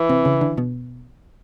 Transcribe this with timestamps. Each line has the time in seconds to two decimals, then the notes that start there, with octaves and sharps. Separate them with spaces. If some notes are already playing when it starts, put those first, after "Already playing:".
Already playing: E3
0.09 C3 C4
0.25 C#3 C#4
0.41 D3 D4
0.57 B2 B3